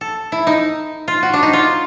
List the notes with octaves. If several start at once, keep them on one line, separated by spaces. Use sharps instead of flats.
A4
E4
D#4
F4
F#4
D4
D#4
F4